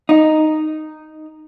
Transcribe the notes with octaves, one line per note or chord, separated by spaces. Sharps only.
D#4